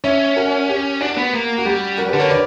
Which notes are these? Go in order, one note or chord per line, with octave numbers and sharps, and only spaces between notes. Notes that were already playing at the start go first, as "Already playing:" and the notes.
C#4 C#5 E5
F#4 A#4
G4
D4 F#4
B3
A#3
F#4
G3 G4
F#4 A#4
G4 B4
D3
A#4 C#5
B4 D5